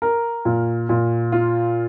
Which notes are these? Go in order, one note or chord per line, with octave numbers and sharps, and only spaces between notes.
A#4
A#2
A#2
F4